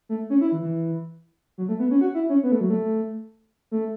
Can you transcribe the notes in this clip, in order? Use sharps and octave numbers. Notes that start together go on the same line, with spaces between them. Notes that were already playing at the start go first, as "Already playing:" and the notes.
A3
C#4
E4
E3
E3
F#3
A3
B3
C#4
F#4
E4
C#4
B3
A3
F#3
A3
A3